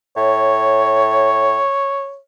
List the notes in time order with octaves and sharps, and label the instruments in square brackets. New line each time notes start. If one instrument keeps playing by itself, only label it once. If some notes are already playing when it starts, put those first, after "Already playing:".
[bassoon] A2 [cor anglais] C#5